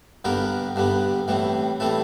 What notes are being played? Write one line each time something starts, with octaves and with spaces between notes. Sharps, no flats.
G2 D3 G3 B3 A#4
G2 D3 G3 B3
A2 E3 G3 C4
A2 E3 G3 C4 A4